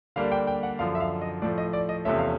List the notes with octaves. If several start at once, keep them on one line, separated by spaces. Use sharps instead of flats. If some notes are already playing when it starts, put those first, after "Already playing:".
D3 G3 A#3 D4 F5
G5
G5
F#5
F#2 D3 F3 F5
E5
F5
D#5
A2 F3 A3 D5
D#5
D5
D#5
E2 C3 F3 A3 C#4 E5
F5